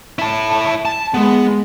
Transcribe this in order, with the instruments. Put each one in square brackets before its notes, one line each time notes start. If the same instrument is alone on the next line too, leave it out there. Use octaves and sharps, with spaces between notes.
[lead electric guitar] E4 A5
A5
[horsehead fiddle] G#3 [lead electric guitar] B3